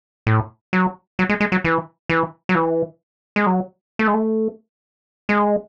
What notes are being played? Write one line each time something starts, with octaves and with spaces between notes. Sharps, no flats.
A2
F#3
F#3
G#3
G#3
F#3
E3
E3
F#3
E3
G#3
F#3
A3
G#3
A3
G#3